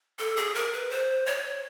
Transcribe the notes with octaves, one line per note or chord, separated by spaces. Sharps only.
A4
G#4
A#4
B4
C5
C#5